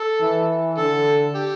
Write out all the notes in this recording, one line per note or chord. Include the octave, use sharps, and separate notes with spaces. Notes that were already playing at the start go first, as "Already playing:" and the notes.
Already playing: A4
E3
D3 A4
G4